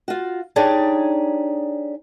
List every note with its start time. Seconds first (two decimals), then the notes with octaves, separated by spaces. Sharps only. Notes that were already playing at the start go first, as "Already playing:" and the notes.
0.08 F4 F#4
0.56 D4 D#4 G4 G#4 C#5 D5